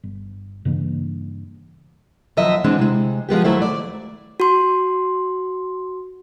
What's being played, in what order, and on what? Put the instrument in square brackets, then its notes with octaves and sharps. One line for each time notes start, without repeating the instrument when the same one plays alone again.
[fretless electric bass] G1
G2 C#3 E3 A#3
[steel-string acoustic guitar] D#2 F3 F#3 D#5 E5
D3 E3 G#3 C4 D4
C3 G#3
F3 G#3 B3 G4
D#2 F#3 A3 E4 C5
D5
[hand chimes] F#4 C6